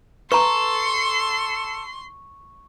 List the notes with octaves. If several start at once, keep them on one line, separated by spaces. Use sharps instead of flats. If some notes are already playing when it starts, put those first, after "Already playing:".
A4 B4 A#5 C6 C#6